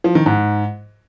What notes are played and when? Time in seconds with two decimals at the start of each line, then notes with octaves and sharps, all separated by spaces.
0.04 F3
0.15 D#3
0.26 G#2